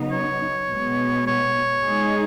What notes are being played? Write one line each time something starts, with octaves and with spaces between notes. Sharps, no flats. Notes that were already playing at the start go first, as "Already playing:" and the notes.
Already playing: C#3 F#3 B3 D#4
C#5
B2 G#3 B3
C#5
G#3 D#4 G#4